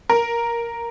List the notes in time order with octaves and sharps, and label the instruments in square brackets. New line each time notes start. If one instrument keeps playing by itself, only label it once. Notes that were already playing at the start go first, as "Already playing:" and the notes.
[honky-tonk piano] A#4